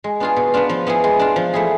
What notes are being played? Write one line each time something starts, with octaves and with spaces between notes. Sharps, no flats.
G#3
B3 D4 F4 G#4
B2
B3 D4 F4
F3
B3 E4 G#4
G#3
D4 F4
F3
A3 E4 G#4